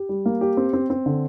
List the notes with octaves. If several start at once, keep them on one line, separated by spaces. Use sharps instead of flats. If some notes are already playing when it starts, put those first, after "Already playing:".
Already playing: G4
G3
A#3
G4
C4
C4
C4
D3